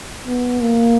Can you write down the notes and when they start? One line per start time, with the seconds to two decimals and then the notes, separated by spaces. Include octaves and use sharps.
0.27 B3
0.61 A#3